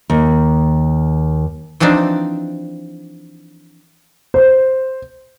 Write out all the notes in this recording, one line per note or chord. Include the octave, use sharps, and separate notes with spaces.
D#2
E3 F3 C4 D4 D#4
C5